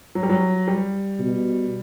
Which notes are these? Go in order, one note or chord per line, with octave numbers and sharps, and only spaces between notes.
F#3
G3
F#3
G3
B2